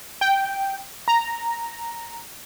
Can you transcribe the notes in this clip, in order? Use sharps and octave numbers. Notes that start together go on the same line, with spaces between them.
G5
A#5